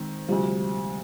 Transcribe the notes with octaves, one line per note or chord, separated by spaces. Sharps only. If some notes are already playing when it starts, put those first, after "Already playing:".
Already playing: D#3 G#3 C4
D2 C3 F3 G3